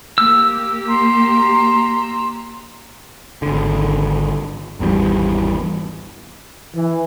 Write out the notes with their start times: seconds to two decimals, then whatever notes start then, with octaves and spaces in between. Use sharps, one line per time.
0.18 A#3 G4 E6
0.88 A#5 C6
3.42 G#1 D3
4.80 G#1 E2 E3 G3
6.75 E3